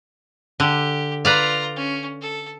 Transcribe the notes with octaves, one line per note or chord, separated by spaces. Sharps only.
D3 G4
F4 B4 D5 F5 A#5
C#4
A4